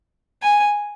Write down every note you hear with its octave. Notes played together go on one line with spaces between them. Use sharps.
G#5